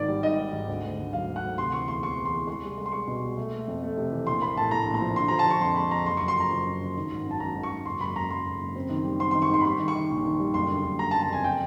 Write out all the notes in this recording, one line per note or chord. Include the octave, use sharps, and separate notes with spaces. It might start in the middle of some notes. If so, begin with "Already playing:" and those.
Already playing: G#1 D#3 D5
G3
G#2 D#5
G#2
G#1
D2
D2
D2
F#3 F5
D2
F#5
D2
C3 C6
E3 C#6
E2 C6
E2 C#6
E2
C6
E3
G#3 C6
C2
G#3
C6
G#3 C#6
B2
C2
A3
A3
F2
A3
C3
E3
A#1 C6
A#3 B5
A2 A5
A2 A#5
A#1
A#5
F3
D3 C6
F3 A#5
A5
F3 C#6
F2 C6
G#3 B5
F2 A#5
F#1 C6
F#1 C#6
C6
F3 A#5
F3
F#2
F#2
D#3
G#1
F#2
A5
G#1 A#5
G#1
C#6
G#1
F#1 C6
F#1 B5
F#1 A#5
F#1 C6
F#1
F#1
C4
D#3
G3
C4 C6
D#3 C6
C#6
G#2 C6
B5
G3 C6
D#3
C#6
D#3
A#1
D#3
G3
F#1 C6
D3
F#1
F#1 A#5
A5
F#1
A5
F2 G#5
G5